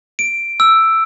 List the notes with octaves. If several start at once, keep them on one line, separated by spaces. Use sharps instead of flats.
D7
E6